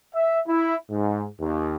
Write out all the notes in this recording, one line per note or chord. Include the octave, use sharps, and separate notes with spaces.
E5
E4
G#2
D#2